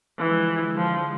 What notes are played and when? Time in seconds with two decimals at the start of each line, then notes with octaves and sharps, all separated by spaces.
0.19 D3 E3 F3 G#3
0.77 F3